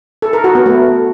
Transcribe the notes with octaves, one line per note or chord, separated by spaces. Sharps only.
A4
A#4
F#4
B3
A3